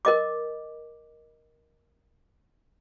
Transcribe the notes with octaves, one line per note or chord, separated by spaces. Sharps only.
A#4 D#5 D6